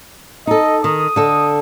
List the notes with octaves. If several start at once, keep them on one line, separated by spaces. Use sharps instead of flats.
D#4 A4 D#5
D#3 D#6
D3 A4 D#5